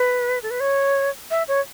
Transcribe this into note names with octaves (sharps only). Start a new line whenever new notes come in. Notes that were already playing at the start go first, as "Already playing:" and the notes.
Already playing: B4
A4
B4
C#5
E5
C#5